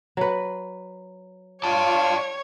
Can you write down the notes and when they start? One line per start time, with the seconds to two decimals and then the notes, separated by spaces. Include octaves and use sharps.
0.17 F#3 B4
1.64 F4 C#5 D5 G5 A5